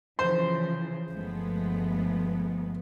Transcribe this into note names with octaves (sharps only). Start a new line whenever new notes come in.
C#3 E3 F3 C5 C6
G1 F3 G#3 A3 B3